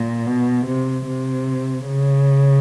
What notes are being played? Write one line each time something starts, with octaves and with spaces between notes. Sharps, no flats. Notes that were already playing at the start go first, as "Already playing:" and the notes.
Already playing: A#2
B2
C3
C3
C#3